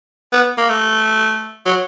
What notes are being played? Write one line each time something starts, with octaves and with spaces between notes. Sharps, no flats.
B3
A#3
A3
F#3